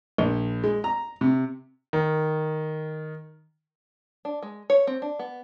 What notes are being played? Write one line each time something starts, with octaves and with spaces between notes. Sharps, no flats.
A#1
G#3
A#5
C3
D#3
D4
G#3
C#5
C4
D4
B3